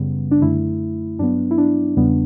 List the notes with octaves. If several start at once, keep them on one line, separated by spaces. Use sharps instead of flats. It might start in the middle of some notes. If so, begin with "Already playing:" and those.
Already playing: F#2 C#3 G3 B3
D4
F#2 D3 A3 E4
G2 F#3 B3 D4
E4
D4
E2 C#3 G3 B3